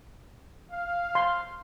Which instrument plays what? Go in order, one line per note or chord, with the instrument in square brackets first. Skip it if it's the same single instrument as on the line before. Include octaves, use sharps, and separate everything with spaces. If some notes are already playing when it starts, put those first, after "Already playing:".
[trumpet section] F5
[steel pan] C6